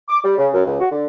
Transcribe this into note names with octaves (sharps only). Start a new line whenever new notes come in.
D6
G3
C#3
F#2
C#2
F#4
D3